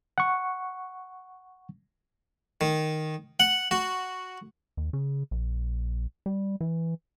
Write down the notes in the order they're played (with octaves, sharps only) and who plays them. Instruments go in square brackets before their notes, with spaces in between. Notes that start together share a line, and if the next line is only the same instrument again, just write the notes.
[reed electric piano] F#5 C#6
[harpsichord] D#3
F#5
F#4
[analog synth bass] D#2
C#3
A#1
G3
E3